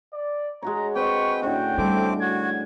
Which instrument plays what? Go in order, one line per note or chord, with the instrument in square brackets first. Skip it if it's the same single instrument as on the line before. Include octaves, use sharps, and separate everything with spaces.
[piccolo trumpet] D5
[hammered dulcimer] G#3 F#4 C#5 [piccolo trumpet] A#5
[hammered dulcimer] C4 D#5 [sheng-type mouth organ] B4 G5 [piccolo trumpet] C#6
[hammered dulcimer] A2 D3 C#4 [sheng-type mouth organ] F#4 [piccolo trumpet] G5
[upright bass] G3 [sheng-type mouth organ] A3 C4 D6
[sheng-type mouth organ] F#4 [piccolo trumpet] G#6